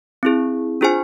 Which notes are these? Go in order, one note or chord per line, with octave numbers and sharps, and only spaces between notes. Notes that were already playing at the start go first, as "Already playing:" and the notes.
C4 E4 G#4
D4 F4 G#4 C5 G#5